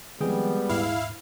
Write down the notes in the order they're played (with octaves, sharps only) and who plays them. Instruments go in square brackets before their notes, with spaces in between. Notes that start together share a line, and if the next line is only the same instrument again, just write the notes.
[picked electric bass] D#3 F3 C4 [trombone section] G3 B3 [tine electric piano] G#3 G#4 G5
[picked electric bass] D#1 G#2 [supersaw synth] E4 F5